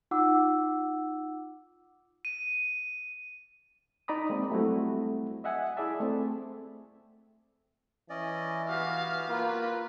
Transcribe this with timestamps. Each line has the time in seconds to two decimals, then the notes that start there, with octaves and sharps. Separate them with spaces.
0.11 D#4 F4 F#5 D6 E6
2.25 D#7
4.08 D#4 D5 A#5 B5 D#6
4.30 G#3 A#3 C4
4.50 F#3 G3 A3 C4 E4 F#4
5.44 D#5 E5 F#5 G#5
5.77 E4 G#4 D5 E5 A5
6.00 A3 C4
8.10 E3 C#4 D5 D#5
8.69 B3 F#4 G4 F5
9.28 A#3 F4 B4